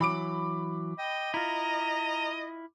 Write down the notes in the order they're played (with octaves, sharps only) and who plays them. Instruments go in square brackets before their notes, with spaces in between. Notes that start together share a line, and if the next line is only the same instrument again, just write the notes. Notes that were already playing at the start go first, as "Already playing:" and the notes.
[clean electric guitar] E3 F#3 [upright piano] B5 D6 D7
[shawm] D#5 [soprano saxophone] G5
[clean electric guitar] E4 F4 [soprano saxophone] A#5